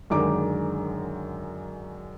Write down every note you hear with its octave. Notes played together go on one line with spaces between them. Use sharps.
F#2 D3 D#3 G#3 D6